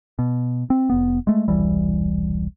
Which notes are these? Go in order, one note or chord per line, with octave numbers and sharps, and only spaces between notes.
B2
C4
F1 B3
G#3 A3
E1 C2 E3 G3